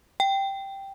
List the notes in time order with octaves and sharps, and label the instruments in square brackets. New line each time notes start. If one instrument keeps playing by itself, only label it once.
[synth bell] G5